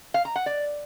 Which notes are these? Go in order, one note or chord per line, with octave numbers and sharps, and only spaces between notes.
F5
A#5
F#5
D5